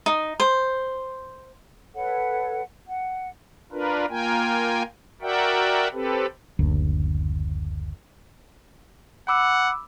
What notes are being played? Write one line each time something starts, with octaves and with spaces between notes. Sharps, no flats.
D#4
C5
A4 B4 C#5 F#5
F#5
D4 F4 A#4 B4
A#3 F4 A#4 G5 G#5
F#4 A#4 D5 E5 F#5 G5
C4 G4 A4 B4
F#1 D2
F#5 B5 D6 E6